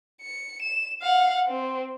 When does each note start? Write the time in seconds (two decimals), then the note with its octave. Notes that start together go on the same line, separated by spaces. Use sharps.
0.22 C#7
0.62 E7
1.01 F5 F#5
1.47 C4